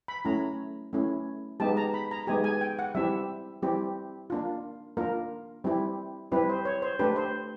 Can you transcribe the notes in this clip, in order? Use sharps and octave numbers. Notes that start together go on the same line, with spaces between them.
B5
A3 C#4 E4 A#5
A3 C#4 E4
G#3 B3 D#4 G4 A5
A#5
B5
A#5
G#3 B3 D#4 G4 G#5
G#5
G5
F#5
G3 C4 E4 G4 E5
G3 C4 E4 G4
A#3 D4 F4
A#3 D4 F4 A#4
G3 C4 E4 G4
G3 C4 E4 G4 B4
C5
C#5
C5
A3 D4 G4 B4
C5